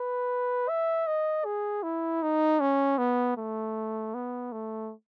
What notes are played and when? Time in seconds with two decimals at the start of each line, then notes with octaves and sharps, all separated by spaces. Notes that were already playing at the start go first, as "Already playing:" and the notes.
Already playing: B4
0.69 E5
1.07 D#5
1.45 G#4
1.83 E4
2.22 D#4
2.60 C#4
2.98 B3
3.37 A3
4.14 B3
4.52 A3